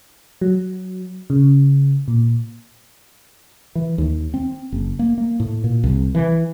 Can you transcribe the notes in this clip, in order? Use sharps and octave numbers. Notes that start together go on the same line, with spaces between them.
F#3
C#3
A#2
E3
D#2
C4
F#1
A#3
A#3
A2
A#2
C2
E3